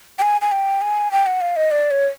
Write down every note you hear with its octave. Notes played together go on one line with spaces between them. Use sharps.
G5
G#5
G#5
G5
G#5
G5
F#5
F5
D#5
D5
C#5